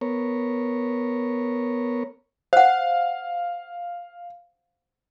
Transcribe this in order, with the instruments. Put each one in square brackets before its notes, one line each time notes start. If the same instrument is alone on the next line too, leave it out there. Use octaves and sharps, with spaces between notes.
[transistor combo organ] B3 A#4 C#5
[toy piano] C5 F#5 [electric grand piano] F5